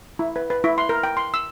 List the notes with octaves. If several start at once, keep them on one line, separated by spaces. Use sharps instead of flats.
E4
B4
B4
E4
C6
A#4
G5
C6
E6